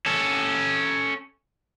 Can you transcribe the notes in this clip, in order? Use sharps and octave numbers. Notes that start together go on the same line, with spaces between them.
C#4 A4